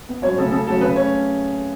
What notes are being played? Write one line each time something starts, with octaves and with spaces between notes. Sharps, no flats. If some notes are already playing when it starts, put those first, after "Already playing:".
B3
F#2 C#5
C#3 A3 C#4 A4
C#3 A4
F#3 A3 C#4 A4
C#3 B4
A3 C#4 C#5